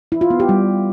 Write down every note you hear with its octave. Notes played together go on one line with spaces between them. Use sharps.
E4
F4
B3
G4
G3